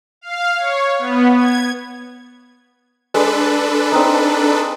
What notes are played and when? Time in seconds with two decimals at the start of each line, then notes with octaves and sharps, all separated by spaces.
0.21 F5
0.57 C#5
0.99 B3
1.36 G#6
3.14 G#3 D4 A4 B4
3.92 C4 D#4